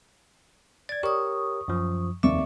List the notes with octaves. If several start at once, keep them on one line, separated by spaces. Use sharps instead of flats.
D5 G#6 A6
G4 A#4 C#5 C#6 D#6
F#2 F3
F1 D#2 D5 E5 C#6 D6